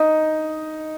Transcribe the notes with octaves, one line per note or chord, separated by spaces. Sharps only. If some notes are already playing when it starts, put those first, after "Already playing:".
Already playing: D#4